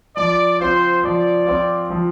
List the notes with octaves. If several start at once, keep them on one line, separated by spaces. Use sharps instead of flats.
F3 D5
C4 F4 C5
F3 D5
C4 F4
F3